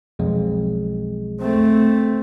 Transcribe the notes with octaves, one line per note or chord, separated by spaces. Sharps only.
B1 F2 G#3
A3 C4